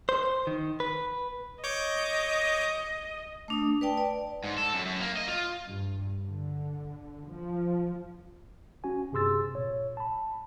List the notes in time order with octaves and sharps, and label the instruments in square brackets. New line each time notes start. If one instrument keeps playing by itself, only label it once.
[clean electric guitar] C5
D#3
B4
[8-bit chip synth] C#5 D6 G6 [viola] D#5
[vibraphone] A3 D4 D#6
B4 D5 G5 A5
D5
[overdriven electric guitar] G#2
A4
F#2
F#2
A#3
D#5
F4
[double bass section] G2
D3
F3
[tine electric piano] C#4 F#4 G#5
G2 C3 G#4 C6 E6 A6
A#2 C#5
A5 B5